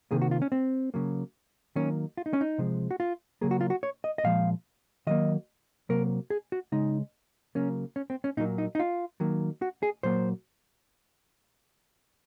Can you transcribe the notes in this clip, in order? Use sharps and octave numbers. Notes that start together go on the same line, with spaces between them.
C3 D#3 A#3 G#4
F#4
F4
C#4
C4
C#3 F#3 A#3
D#3 F#3 A#3 C#4
F4
D#4
C#4
D#4
C3 F3 G#3
F#4
F4
C#3 F#3 A#3 G#4
F#4
F4
F#4
C#5
D#5
D#5
A#2 F3 G#3 F5
D#3 F#3 A#3 D#5
C3 F#3 A#3 A#4
G#4
F#4
C#3 G#3 D#4
C#3 F#3 A#3 C#4
C#4
C4
C#4
A#2 F#3 A#3 D#4
D#4
D#4
F4
D#3 F#3 A#3
F#4
G#4
A#2 F#3 A#3 C5